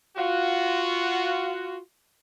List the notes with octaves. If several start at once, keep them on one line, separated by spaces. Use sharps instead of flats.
F4 F#4